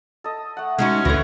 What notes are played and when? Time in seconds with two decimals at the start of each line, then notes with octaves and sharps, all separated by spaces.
0.24 A4 D#5
0.57 A3 F#5
0.79 G#3 C#4 D#4 F#4
1.05 D2 D3 E3 E4 C#5 A#6